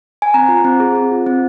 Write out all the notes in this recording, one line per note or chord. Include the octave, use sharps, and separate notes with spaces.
G#5
C4 A#5
F4
C4
G#4
C4
F4
C4